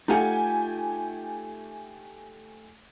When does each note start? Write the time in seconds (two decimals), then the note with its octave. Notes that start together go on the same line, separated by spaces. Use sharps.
0.08 A3 D#4 F4 G4 F#5 G#5